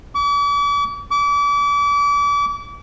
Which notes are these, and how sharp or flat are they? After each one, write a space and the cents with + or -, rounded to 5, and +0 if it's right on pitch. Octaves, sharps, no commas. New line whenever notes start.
D6 -45
D6 -35